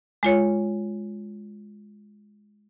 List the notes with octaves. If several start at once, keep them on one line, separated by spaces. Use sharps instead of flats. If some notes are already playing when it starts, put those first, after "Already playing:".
G#3 F4 C#5